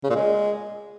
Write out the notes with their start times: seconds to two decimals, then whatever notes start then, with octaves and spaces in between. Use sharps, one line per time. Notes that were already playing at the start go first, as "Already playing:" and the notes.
0.04 C#3
0.10 A#2
0.16 G#3